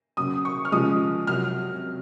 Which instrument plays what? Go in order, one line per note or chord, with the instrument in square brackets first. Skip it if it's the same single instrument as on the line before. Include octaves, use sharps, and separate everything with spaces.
[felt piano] C#3 F#3 D#6
C#6
F6
C#3 F3 G#3 D#6
C3 F#3 F6